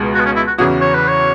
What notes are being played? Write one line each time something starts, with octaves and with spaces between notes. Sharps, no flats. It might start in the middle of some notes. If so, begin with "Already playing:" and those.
Already playing: C#2 B2 G#3
F#4
B3
C#4
E4
F#4
E2 C#3 E3 C#4 F#4 G#4
C#5
B4
C#5